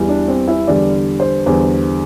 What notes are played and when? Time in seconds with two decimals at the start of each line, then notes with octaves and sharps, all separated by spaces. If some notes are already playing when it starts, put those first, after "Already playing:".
Already playing: E2 E3 G3
0.09 D4
0.28 C4
0.48 E4
0.67 E2 D3 G3 D5
1.20 C5
1.46 E2 D3 G3 C5